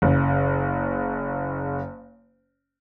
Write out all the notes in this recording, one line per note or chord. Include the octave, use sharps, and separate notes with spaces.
F#1 C#3